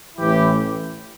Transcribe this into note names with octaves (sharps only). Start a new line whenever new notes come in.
A1 A2 E3 E4 G4